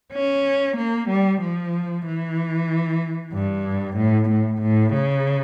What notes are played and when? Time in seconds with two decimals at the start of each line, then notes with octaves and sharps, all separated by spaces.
0.13 C#4
0.77 A#3
1.09 G3
1.41 F3
2.06 E3
3.34 G2
3.97 A2
4.30 A2
4.62 A2
4.94 C#3